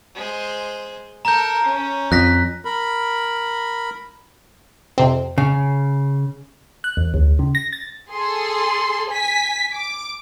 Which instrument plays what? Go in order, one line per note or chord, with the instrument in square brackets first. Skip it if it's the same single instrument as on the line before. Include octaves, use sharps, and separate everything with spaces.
[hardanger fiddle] G#3 C5
[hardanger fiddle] A4 A#4 [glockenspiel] A#5 G6
[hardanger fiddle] C#4
[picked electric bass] F2 [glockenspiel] F#6 A#6 B6
[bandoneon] A#4 B5
[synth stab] F2 C3 C4
[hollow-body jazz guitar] C#3
[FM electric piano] F#6
E2
D2
C#3
A#6
A6
[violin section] G#4 A4 C6
G#5 B6
D6